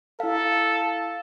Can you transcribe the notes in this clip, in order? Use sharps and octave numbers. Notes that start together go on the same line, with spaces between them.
E4 A4 F5